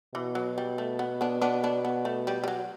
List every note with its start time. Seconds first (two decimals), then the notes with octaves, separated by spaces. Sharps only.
0.14 B2 E3
0.35 F#3
0.58 G3
0.78 A3
0.99 B3
1.21 B3 D4
1.41 B3 D4
1.64 B3 D4
1.85 B3
2.05 A3
2.27 G3
2.44 G3
2.48 F#3